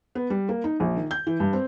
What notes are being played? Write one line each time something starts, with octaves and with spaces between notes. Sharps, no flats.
B3
G3
A#3
D#4
A#1
D#3
G6
E3
G2
C4